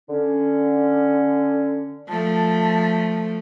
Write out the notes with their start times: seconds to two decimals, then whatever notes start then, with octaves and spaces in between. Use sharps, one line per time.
0.09 D3 C#4
2.08 F3 A3 A5